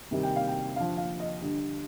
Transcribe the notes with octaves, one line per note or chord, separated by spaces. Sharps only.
C3 D#3 G3
G5
F5
G5
D3 F3 F5
F5
D#5
D3 G3